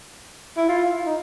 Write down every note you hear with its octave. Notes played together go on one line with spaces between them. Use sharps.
E4
F4
D#4